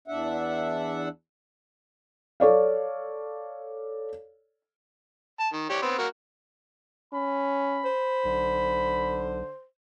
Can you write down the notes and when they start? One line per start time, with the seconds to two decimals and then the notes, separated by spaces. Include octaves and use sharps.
0.08 E2 D4 E5 F#5
2.40 A4 C#5 D5 F5
5.40 A5
5.53 D#3
5.70 G4 C#5 D5
5.82 B3 C4
5.99 A#3 F#4 A#4
7.13 C#4 B5
7.84 C5
8.25 B1 D3